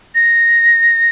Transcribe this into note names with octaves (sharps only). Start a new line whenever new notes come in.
A#6